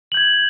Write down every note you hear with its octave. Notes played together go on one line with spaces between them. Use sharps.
G6 G#6 F#7